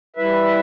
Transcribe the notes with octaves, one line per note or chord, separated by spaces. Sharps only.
G3 E4 B4 E5